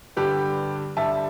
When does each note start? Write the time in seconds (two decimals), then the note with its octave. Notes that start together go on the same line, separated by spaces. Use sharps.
0.16 G2 D3 G3 G4 B4
0.97 G2 D3 G3 E5 A5